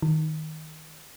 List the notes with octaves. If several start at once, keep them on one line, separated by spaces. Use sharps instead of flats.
D#3